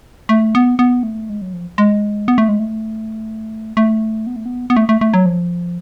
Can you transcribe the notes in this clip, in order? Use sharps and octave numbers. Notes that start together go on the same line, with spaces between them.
A3
B3
B3
A3
G#3
F#3
F3
G#3
B3
A3
G#3
A3
A3
B3
A3
B3
B3
A3
A3
A3
F#3
F3